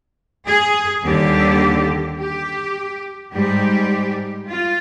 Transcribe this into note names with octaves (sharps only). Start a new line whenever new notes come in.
G#4
D#2 D3 G3 G4
G4
G#2 G3 G4
F4